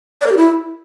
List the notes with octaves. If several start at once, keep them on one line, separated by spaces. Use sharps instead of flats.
D5
A#4
G4
E4